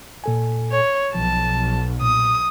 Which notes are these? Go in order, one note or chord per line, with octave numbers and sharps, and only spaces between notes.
A#2 A4 G#5
C#5
B1 F3 A5
A#2 D#6